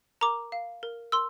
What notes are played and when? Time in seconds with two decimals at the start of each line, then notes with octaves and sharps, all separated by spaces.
0.21 A#4 A#5 D6
0.52 F5
0.83 A#4
1.12 A#4 C6 E6